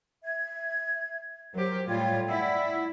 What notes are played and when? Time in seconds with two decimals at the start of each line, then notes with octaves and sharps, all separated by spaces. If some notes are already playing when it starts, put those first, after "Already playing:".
0.24 E5 G#6
1.54 F#3 G4 A#4 C5
1.88 A2 G3 F4 C#5 G5 G#6
2.29 E4 D5 F#5 E6